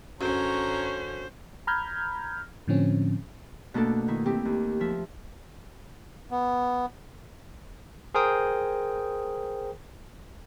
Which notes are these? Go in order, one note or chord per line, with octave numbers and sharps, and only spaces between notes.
F#2 D3 F#3 C#4 C5 C#5 A#5
A#5 B5 F6 G6 G#6
A2 D3 F3 C4 C#4
B2 A3 A#3 D4 A4
D#3 E4
C4 E4 G4
D#2
F3 E5
B3
G#4 A#4 C5 G5 D#6